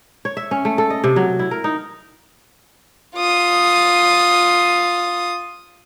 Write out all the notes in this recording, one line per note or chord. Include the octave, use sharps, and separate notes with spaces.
C#5
E5
C#4
A3
A4
D#5
C3
F#3
E4
A#4
D#4
F4 D#6